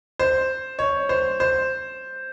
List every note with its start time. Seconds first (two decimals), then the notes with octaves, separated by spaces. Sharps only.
0.19 C5
0.79 C#5
1.09 C5
1.40 C5